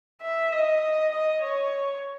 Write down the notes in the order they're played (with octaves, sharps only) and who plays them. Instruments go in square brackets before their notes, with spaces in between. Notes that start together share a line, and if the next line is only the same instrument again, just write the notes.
[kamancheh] E5
D#5
D#5
C#5